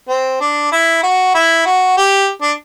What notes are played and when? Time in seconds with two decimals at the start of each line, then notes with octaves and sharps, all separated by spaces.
0.09 C4
0.41 D4
0.72 E4
1.03 F#4
1.35 E4
1.66 F#4
1.97 G4
2.42 D4